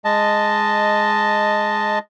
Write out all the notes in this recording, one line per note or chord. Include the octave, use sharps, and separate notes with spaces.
G#3 D#5 A5